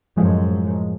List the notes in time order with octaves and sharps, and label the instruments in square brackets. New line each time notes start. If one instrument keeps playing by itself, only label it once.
[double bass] F#2 [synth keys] A2 F3 G#3